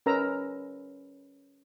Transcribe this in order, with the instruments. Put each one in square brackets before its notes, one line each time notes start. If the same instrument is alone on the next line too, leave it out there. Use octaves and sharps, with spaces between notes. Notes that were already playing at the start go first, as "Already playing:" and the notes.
[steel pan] C#4 A#4 B4 A#5 E6